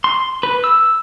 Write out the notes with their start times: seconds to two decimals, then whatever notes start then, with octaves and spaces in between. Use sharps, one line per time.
0.04 C6
0.43 B4
0.64 E6